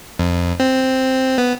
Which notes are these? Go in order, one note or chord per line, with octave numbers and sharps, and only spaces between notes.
F2
C4
B3